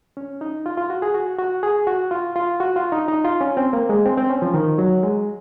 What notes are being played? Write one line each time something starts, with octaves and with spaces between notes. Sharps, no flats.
C#4
D#4
F4
F4
F#4
G#4
F#4
F#4
G#4
F#4
F4
F4
F#4
F4
D#4
D#4
F4
C#4
C4
A#3
G#3
C4
C4
C#4
F3
D#3
F#3
G#3